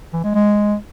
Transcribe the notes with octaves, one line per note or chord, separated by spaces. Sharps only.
E3
G#3
G#3